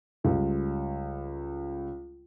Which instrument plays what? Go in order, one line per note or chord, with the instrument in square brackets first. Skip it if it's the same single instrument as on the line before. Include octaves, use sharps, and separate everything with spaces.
[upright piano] C#2 G3